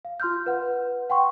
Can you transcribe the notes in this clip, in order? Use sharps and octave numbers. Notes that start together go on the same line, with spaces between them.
F5
F4 C6 F6 G6
B4 F#5
F#5 G5 C6 C#6